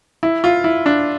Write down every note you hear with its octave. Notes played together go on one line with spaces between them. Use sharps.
E4
F4
E4
D4